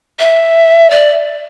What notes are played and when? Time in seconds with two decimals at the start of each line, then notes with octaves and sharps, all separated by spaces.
0.19 E5
0.91 D5